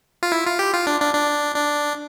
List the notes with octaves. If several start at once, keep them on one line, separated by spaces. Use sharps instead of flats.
F4
E4
F4
G4
F4
D4
D4
D4
D4